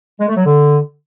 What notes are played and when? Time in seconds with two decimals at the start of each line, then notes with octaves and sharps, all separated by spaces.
0.20 G#3
0.28 A3
0.37 F#3
0.45 D3